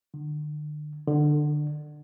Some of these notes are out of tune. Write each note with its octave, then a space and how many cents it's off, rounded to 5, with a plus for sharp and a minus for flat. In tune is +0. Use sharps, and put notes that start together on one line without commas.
D3 +35
D3 +20